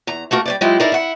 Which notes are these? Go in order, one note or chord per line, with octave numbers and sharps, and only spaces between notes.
E2 A#5
A3 A#3 F#4 A#4
G3 C#5 D5
F#3 G#3 E4 F4 G4
D#4 E4 G#4 A#4 D5 D#5
E4 F#5